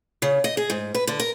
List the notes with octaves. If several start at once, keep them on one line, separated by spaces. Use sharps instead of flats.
C#3
D#5
G#4
G#2
B4
D3
A#4